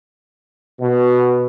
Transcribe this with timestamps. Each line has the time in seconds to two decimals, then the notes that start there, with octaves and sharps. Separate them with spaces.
0.81 B2